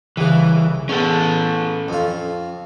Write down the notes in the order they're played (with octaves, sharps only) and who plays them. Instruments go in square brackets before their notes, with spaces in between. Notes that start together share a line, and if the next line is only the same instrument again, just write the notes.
[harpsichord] C2 C#3 [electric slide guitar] E3
[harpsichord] E2 [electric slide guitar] C#4 A4
[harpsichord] F2 F4